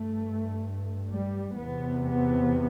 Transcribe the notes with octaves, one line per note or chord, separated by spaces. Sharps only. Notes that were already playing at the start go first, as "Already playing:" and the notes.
Already playing: G2 A3
G3
E2 C3 B3
B3